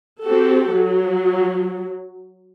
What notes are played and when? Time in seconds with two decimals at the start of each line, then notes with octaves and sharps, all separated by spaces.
0.23 C4 F#4 G4 A4
0.73 F#3